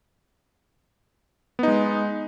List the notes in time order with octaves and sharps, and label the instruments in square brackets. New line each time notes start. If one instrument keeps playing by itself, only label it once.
[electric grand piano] B3
D#4
G#3